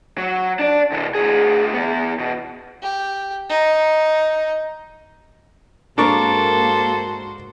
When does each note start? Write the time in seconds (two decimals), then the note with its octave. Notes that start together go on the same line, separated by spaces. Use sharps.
0.18 F#3
0.59 D4 D5
0.91 C3 E3
1.15 D2 G#4
1.74 E3 B3
2.19 B2
2.82 G4
3.49 D#4
5.98 G#2 A#3 D4 F#4 A4 A#4 C5 C#6